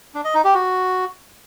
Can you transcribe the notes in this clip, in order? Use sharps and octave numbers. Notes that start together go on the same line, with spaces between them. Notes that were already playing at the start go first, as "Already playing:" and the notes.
D4
D#5
D#4
G4
F#4